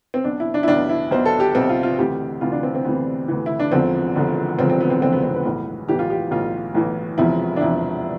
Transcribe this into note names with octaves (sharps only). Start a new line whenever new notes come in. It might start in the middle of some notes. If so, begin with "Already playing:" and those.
C4
B1 B2 D4
E4
D4
E4
B1 B2 D4
E4
B1 B2 C5
A4
G4
B1 B2 C4
F4
F4
D2 C3 E3 G4
D2 C3 E3 F4
D4
C4
C4
D2 C3 E3 B3
D2 C3 E3
E4
D4
E1 E2 D3 F3 C4
E1 E2 D3 F3
E1 E2 D3 F3 C4
C4
B3
C4
E1 E2 D3 F3 C4
B3
C4
B4
B1 A2 E3
B1 A2 E3 G4
F4
G4
B1 A2 E3 F4
B1 A2 E3
E1 E2 C3 F3 E4
D4
E1 E2 C3 F3 E4